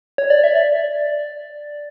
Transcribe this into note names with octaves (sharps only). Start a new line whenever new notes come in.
C#5
D5
E5
D5